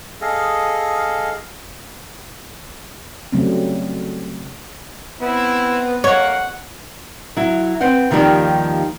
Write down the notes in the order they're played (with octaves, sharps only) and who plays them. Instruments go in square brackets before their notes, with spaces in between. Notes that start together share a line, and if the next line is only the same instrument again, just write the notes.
[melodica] G#4 A4 D#5 F5
[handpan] C#3 F#3 G3 A3 C4 C#4
[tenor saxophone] B3 [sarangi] C4 [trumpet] E4
[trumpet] A#3 [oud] C#5 [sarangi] F#5
[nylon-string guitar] F#3 E4
C4 B4 C5 F#5
D#2 D#3 F3 G3 G4